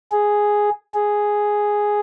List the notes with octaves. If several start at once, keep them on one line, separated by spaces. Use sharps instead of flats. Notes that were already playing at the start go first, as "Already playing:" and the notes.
G#4
G#4